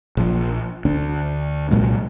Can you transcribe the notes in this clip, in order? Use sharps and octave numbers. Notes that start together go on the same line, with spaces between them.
A#1 F3
D2 D4
C2 A#2 F#3 G#3